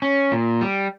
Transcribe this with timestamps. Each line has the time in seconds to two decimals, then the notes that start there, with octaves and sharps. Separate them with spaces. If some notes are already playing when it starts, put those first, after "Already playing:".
0.02 C#4
0.32 A#2
0.61 G3